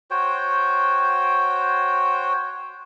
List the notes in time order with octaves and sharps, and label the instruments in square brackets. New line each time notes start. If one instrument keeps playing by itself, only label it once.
[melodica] F#4 C5 C#5 G5